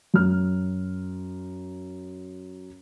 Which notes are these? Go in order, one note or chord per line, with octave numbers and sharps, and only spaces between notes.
F#2 F6